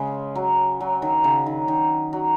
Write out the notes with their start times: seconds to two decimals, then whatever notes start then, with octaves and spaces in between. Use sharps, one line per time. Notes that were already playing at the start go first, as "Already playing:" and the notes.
Already playing: C#3 G#3 C#4
0.35 F#3
0.81 F#3
1.02 D#3
1.24 C#3
1.46 D#3
1.68 D#3
2.13 F#3